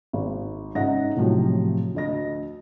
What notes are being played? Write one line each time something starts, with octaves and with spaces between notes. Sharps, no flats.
G#1
G#2 C#3 D#4 E5 F#5 A#6
A2 C3 F3 F#3
D2 D#5 A#6